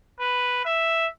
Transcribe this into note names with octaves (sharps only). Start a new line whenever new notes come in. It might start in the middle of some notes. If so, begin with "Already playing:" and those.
B4
E5